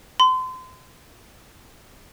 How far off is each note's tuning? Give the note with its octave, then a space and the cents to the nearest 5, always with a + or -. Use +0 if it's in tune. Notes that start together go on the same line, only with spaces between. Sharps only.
C6 -35